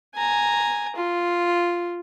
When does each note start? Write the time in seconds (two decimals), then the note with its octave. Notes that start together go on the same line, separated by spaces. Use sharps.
0.15 G#5 A#5
0.96 F4